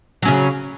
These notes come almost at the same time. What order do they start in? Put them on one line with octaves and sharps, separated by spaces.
F#3 C#4 C#3